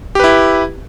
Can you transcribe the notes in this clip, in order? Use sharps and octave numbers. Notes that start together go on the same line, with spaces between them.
E4 G4 B4